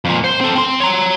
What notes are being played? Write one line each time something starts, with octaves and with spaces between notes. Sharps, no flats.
F2 A#2
C5
C4 A4
C4 C6
C#5 A#5